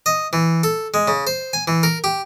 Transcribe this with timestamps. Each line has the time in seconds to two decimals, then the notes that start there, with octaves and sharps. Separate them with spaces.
0.06 D#5
0.33 E3
0.64 A4
0.94 G#3
1.08 C#3
1.27 C5
1.53 G#5
1.68 E3
1.83 A#4
2.04 G4